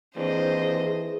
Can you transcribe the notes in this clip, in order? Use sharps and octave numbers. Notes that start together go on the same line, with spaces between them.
D#2 E3 C4 D4 G#4 C5 D#5